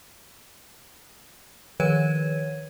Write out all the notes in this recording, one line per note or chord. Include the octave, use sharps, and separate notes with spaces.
D#3 F3 B4 C#5 G#6 D#7